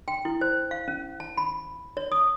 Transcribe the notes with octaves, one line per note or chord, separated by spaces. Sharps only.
G5
E4
C5
F5
C#4
A5
B5
C#5
D#6